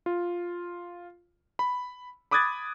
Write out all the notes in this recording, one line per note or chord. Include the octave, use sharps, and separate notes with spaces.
F4
B5
B5 D6 D#6 F#6 G#6 A6